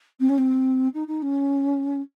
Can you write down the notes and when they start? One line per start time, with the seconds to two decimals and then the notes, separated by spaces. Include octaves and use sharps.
0.20 C4
0.29 C#4
0.37 C4
0.93 D#4
1.07 D#4
1.22 C#4